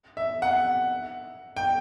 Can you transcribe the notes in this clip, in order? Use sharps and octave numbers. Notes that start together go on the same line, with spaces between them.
E5
F#5
G5